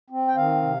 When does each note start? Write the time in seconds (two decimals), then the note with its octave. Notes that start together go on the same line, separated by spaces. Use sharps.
0.10 C4
0.28 G5
0.36 D#3 F5
0.62 C3